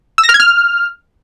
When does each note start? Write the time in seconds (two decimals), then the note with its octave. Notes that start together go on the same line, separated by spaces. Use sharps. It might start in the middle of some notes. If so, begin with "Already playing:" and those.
0.18 E6
0.23 A#6
0.29 F6
0.34 G#6
0.40 F6